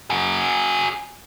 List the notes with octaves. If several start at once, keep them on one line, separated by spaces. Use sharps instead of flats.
F#4 G#4